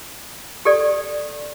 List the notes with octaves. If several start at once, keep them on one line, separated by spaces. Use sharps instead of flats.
G4 A4 D5